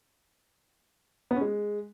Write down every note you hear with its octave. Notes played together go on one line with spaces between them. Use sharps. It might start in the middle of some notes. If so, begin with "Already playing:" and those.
B3
C#4
G#3